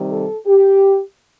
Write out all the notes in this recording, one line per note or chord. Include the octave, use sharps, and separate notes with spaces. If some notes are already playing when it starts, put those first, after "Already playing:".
Already playing: C3 D#3 G3
A4
G4